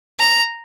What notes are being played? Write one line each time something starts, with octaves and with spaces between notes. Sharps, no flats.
A#5